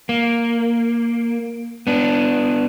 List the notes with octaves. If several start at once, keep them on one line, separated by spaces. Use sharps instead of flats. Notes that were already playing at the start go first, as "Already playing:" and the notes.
A#3
B3 D4